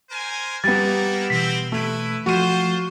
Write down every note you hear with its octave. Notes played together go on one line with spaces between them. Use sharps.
A#4 C5 G#5
G3 A#3 B3 D#4 E4 A6
B2 E3 C4 B6
A3 E4 B4
F3 A3 F4 F#4 C5 D#7